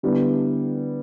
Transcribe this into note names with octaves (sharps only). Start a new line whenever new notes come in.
D3 G3 B3 E4 B4